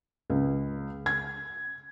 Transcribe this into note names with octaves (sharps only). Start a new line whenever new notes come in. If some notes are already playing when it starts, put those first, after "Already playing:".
C#2
G#6